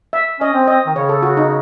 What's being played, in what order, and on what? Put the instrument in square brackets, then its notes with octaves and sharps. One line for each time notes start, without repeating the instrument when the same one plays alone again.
[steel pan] E5
[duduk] C#4 [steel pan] D#5
[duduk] C4
[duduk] C4 [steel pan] D#5
[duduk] D#3
[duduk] C#3 [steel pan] C#5
[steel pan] A4
F#4
D#4